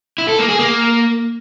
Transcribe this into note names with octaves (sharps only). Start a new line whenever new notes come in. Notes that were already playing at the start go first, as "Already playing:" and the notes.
E4
A4
A#3
G#4
A#3